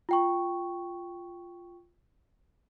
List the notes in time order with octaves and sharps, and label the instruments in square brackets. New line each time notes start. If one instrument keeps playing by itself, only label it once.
[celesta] F4 G5 C#6